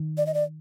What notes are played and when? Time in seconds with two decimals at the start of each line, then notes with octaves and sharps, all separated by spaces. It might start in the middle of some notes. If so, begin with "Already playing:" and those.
Already playing: D#3
0.18 D5
0.26 D#5
0.34 D5